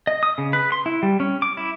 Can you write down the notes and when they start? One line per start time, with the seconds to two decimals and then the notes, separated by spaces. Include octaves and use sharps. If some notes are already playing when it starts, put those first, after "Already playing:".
0.07 D#5
0.23 D#6
0.38 C#3
0.53 B4
0.72 C6
0.86 E4
1.03 G3
1.20 C#4
1.42 D6
1.57 E4